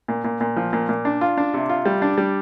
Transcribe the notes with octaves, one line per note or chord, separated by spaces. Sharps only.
A#2
A#2
A#2
F3
A#2
A#2
D4
F4
D4
C3
F4
G3
D4
G3